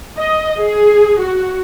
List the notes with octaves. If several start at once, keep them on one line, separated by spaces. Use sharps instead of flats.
D#5
G#4
F#4